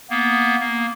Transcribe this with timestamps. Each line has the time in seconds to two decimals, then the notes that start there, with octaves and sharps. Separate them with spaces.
0.10 A#3 B3
0.60 A#3